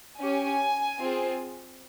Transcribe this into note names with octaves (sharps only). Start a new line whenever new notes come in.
C#4 G4 G#5
C4 F4 G#4